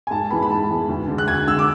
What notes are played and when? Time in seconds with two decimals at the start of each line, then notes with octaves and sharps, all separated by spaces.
0.07 G#5
0.11 G#2 A5
0.30 E3 G#3 B3 B5
0.42 B5
0.50 G#2 A5
0.70 E3 G#3 B3
0.88 D2
1.08 D3 G#3
1.18 F#6
1.27 D2 G#6
1.47 D3 G#3 E6
1.59 D6